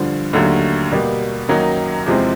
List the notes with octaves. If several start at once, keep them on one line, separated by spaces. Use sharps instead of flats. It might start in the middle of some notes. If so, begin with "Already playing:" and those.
Already playing: G2 D3 F3
D#2 D3 F#3 A3
B2 G3 A#3
F#2 D#3 F#3 A#3 D#4
E2 C3 F3 G#3 C4